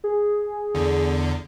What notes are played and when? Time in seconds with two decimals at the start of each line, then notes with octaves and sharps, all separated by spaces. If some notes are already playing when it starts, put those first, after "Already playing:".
0.04 G#4
0.75 E2 D3